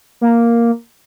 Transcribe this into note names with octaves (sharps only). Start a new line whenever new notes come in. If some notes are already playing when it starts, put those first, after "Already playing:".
A#3